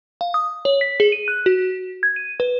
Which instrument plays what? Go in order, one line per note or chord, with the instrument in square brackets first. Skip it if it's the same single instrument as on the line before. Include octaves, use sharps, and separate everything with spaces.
[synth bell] F5
D#6
C#5
B6
G#4
D#7
F#6
F#4
G#6
D#7
B4